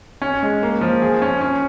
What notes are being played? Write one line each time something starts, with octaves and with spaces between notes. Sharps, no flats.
C#4
G#3
A#3
F3
G#4
C#4
C#4